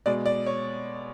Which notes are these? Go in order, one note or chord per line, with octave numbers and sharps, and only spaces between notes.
B2 G#3 D5
D5
C#5